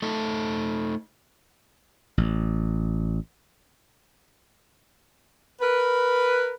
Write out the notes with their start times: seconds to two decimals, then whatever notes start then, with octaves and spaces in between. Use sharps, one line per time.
0.02 A3 D#4 A4
2.18 A1
5.61 A#4 B4